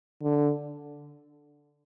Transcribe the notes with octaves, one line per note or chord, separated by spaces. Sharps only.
D3